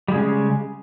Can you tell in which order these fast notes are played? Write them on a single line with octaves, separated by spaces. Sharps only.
G3 G#3 C#3